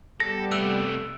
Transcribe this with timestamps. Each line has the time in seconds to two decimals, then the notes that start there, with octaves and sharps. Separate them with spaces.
0.20 G3 B3 G4 A4 A#6
0.51 C3 A3 E6 F#6 D7